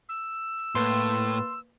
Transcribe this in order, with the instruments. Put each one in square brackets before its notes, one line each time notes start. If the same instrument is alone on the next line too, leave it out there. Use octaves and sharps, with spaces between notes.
[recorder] E6
[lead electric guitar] A2 [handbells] A#3 B4 A6 [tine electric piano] C6